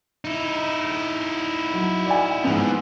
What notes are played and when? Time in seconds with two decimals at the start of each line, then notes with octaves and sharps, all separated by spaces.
0.25 D#4 E4
1.74 F#3
2.06 D5 F#5 G#5
2.44 G#2 E3 F3 B3